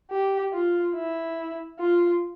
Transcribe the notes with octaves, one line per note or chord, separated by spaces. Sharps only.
G4
F4
E4
F4